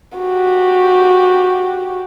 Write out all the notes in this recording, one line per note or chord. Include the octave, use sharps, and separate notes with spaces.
F#4 G4